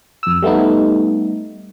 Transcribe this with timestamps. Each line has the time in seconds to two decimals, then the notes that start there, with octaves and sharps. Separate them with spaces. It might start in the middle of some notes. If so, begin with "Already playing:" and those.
0.23 F2 E6
0.42 G3 A3 B3 D#4